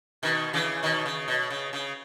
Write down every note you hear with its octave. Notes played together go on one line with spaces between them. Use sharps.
B2 D#3
C#3 E3
B2 D#3
C#3
B2
C#3
C#3